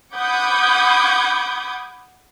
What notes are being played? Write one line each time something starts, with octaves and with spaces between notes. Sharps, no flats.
F#5 B5 D6 D#6 G6 G#6